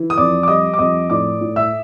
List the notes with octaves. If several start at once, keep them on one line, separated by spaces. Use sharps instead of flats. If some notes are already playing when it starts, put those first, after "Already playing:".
Already playing: E3
D#6
F2 D5 D6
D6
G3 D#5 D#6
D6
F2 D#5 D#6
A2 D5 D6
A2
E5 E6